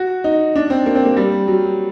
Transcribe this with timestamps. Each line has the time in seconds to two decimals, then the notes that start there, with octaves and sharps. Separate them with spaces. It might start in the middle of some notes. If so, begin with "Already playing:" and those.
Already playing: F#4
0.24 D#4
0.55 D4
0.70 C4
0.86 A#3
0.95 C4
1.05 A#3
1.17 G3
1.47 F#3